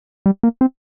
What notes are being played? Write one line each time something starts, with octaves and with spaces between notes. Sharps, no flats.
G3
A#3
C4